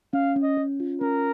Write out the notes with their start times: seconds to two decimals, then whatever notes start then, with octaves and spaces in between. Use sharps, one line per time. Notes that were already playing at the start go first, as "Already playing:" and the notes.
0.13 C#4 F5
0.36 C#4
0.43 D#5
0.57 C#4
0.80 F4
1.01 C#4 A#4